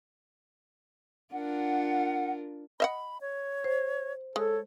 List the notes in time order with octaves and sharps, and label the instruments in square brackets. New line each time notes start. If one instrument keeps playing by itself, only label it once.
[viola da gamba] D4 F4 A#4 [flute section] F#5
[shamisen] D#5 E5 F#5 [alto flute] B5
[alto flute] C#5
[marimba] C5
[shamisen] G#3 [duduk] A4 [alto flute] C#5